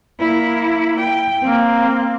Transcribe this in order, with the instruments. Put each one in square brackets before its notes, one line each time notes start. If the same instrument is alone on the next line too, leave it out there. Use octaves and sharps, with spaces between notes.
[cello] A#3 E4
G5
[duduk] A#3 [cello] C4